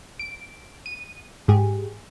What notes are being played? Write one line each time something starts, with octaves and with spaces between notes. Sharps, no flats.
D7
D#7
G#2 G4 G#4